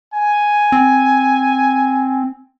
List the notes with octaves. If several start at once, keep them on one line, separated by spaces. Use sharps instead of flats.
G#5
C4